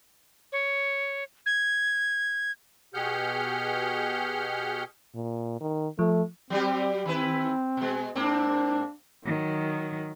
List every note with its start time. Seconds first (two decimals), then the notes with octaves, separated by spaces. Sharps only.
0.52 C#5
1.46 G#6
2.94 B2 G4 G#4 F#5 F6 G6
5.15 A#2
5.61 D#3
5.99 F3 A3
6.50 F#3 G3 C4 G4
7.06 D#3 C4 E4 B4
7.77 B2 G#3
8.15 G#2 A#3 C4 D4
9.26 D#3 F#3